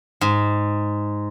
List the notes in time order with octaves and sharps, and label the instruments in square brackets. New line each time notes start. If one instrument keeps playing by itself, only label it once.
[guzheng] G#2